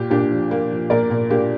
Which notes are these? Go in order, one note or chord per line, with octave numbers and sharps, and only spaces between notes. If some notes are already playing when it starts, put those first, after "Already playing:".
Already playing: A#2 A#3 G4
A#2 D4 G4
F3
A#3
F3
A#2 A#4 D5
A#2
A#3 D4 G4